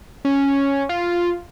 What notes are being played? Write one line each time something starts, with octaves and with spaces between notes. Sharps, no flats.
C#4
F4